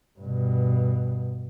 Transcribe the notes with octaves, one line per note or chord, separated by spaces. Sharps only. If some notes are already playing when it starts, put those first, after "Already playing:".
G2 B2